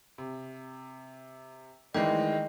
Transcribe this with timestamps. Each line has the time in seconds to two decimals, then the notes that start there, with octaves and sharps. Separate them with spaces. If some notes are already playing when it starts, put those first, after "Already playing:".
0.18 C3
1.94 D#3 E3 G#3 A3 D#5 G5